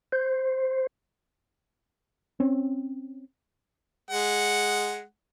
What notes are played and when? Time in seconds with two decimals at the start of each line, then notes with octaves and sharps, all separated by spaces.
0.12 C5
2.40 C4 C#4
4.11 G#3 F#5